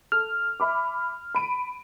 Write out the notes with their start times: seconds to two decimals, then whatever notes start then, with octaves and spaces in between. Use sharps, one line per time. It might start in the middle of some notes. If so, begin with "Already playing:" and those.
0.12 A4 F6
0.60 E5 B5 D6
1.35 B5 D7 D#7